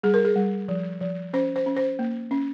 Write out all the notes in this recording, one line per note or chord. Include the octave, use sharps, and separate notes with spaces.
G3 G#4
A#4
G#4
G3
F3
F3
C#4 C5
C5
C#4
C5
A#3
C#4